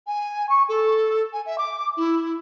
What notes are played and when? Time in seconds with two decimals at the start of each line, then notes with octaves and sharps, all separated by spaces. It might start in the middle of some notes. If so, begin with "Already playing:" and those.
0.06 G#5
0.48 C#6
0.68 A4
1.32 G#5
1.45 E5
1.57 D6
1.96 E4